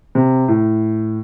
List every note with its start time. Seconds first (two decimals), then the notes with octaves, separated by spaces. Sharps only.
0.15 C3
0.48 A2